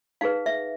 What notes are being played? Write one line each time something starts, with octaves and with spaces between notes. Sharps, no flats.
D#4 G#4 B4 F5
E5